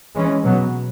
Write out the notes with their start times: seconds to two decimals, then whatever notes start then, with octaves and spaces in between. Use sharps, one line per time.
0.15 E3 G#3 C#4
0.44 B2 F#3 B3